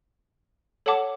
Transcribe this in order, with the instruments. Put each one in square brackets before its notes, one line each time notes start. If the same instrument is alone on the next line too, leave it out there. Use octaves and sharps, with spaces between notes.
[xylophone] A4 C#5 F#5 A5 D6